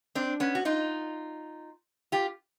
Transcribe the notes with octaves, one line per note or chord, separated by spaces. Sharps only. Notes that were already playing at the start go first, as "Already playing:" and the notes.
C4 D4
B3 C#4
F#4
D#4 F4
F4 G4